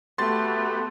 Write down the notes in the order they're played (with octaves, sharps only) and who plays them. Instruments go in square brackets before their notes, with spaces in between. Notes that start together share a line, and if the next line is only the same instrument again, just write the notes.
[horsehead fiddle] A3 [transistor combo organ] B3 F#4 G4 [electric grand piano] C6 A6